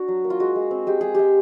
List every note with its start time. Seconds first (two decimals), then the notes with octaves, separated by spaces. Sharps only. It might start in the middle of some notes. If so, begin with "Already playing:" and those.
Already playing: D4 F#4
0.08 F#3
0.24 A#3
0.30 F4
0.40 G#3 F#4
0.56 G#3
0.71 C4
0.87 G#3 G4
1.01 G#3 G#4
1.15 G#3 G4